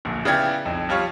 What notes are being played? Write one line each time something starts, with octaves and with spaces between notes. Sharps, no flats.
D1 A#1 A#2
C#3 B3 E4 D5 G5 G#6
B1 F2
F3 G3 F4 C#5